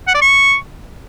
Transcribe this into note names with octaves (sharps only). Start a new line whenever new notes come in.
F#5
D5
C#6